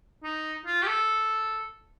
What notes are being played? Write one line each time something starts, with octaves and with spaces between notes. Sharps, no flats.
D#4
F4
G4
A4